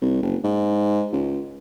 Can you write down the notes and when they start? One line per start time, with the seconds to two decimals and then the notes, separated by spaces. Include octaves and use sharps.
0.02 C2
0.23 F#1
0.44 G#2
1.13 C#2